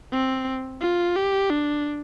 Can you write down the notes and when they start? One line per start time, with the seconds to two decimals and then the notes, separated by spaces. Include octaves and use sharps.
0.12 C4
0.81 F4
1.16 G4
1.50 D4